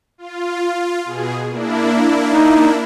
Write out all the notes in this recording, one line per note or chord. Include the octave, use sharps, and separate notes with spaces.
F4
B2 G#4
A#3 D4 E4
D#4